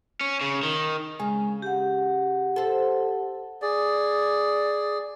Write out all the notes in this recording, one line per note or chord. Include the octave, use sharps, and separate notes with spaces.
C#4
C#3
D#3
C#3 G#3
G4 F#5
A4 C5
G#4 D5